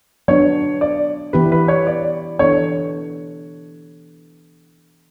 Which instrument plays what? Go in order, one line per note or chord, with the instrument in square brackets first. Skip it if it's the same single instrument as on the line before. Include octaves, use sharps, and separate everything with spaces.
[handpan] F#3 B3 D4 [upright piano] C#5
[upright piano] D5
[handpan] E3 B3 E4 G4 [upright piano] B4
[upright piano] B4
C#5
D5
[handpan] E3 B3 D4 A4 [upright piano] C#5